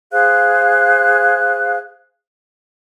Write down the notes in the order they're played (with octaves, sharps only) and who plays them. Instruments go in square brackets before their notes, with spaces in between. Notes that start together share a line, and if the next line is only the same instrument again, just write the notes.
[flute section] G#4 C5 F5 F#6